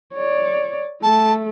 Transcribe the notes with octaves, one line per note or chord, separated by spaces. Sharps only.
C#5 D5
A3 A5